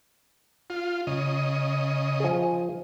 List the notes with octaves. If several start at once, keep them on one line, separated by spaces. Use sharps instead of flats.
F4
C#3 D#5
F3 G#4